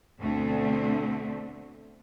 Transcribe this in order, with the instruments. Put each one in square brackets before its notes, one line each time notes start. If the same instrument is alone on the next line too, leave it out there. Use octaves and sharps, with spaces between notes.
[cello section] D2 B2 D3 A3 C4